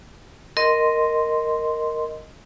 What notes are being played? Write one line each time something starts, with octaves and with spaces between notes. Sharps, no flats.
A#4 D#5 C6